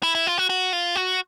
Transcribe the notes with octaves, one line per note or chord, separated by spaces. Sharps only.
E4
E4
F4
F#4
F#4
F4
F#4